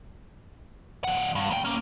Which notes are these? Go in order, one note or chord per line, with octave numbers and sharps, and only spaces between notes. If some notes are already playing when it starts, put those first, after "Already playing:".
F3 F#5
G2
D#2 G5
A#3 C#4